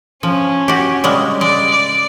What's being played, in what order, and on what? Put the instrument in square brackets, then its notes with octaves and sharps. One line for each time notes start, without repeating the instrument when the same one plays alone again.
[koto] F3 [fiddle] C#4
[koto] F#4 G4
C#3 G3 G#3
[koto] G#3 [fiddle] D5
[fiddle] D5